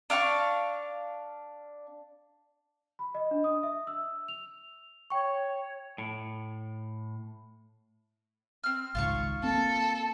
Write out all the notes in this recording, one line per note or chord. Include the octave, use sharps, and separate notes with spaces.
D4 F5 F#5 C#6
B5
D#5
D4
D#6
E5
E6
F7
C#5 G5 C#6
A2
C4 F6
G#1 C#2 G#2 F4 F5 C#6
A#3 C4 A4